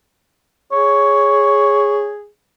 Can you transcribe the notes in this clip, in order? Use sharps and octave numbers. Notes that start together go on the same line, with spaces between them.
G#4 C#5